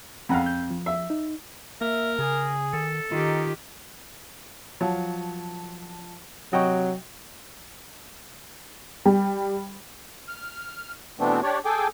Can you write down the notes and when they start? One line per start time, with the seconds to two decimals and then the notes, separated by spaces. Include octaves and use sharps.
0.29 F2 F5 F#5 A#5 B5
0.46 G6
0.71 F3
0.86 E5
1.10 D#4
1.81 A#3 A#4 E5
2.19 C#3 G#4
2.73 D#3 A4
3.12 D#3 D#4 F4 G4
4.81 F3 F#3 F4 A5
6.53 C3 F#3 F#4 D#5 G5 C#6
9.06 G3
10.28 F6
11.20 B2 E3 A3 B3 C4 D4
11.43 D4 G4 C#5 D5
11.65 G#4 A4 G5 G#5 D6